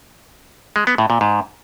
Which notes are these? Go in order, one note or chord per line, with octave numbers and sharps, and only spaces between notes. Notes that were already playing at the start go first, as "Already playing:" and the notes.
G#3
B3
A2
A#2
G#2